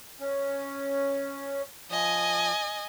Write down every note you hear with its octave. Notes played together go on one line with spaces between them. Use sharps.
C#4
F3 D#5 G#5